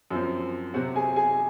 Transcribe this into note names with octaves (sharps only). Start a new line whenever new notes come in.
F#2 F3 C4
C3 F#3 C4 F#4 F#5
G#4 G#5
G#4 G#5